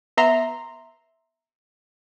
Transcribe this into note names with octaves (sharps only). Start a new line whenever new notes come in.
B3 E5 A#5 C6